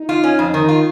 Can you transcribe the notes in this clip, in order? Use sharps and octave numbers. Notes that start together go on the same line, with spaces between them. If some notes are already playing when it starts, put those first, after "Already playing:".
Already playing: D#4
F4
C#4
F2 D#4
D#3
F4